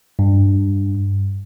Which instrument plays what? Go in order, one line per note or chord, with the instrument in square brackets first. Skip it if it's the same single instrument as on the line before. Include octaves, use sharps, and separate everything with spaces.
[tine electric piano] G2